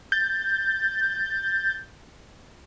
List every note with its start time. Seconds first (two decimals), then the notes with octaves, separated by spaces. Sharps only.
0.12 G6 A6